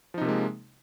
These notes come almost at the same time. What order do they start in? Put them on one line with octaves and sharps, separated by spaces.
F3 D#4 C3 A#3 G#3